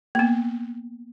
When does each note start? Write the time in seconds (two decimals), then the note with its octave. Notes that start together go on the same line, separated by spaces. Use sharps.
0.15 A#3 B3